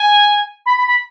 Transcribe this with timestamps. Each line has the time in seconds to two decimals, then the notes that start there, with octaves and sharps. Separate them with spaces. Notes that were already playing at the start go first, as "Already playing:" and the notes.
Already playing: G#5
0.66 B5
0.77 B5
0.87 B5